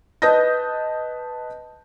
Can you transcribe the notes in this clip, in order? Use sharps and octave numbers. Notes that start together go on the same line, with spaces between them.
B4 D#5 A5 D#6 G6 A#6